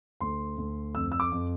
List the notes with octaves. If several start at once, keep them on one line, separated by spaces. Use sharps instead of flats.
D2 C6
D2
F2 E6
E6
D6
F2